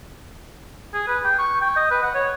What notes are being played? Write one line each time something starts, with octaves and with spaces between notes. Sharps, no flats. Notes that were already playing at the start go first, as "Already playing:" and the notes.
G#4
B4
G5
C#6
G5
D#5
B4
F#5
C#5